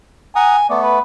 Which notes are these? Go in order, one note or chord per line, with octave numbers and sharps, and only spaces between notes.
F#5 G#5 A#5 D#6
A3 B3 D5
B4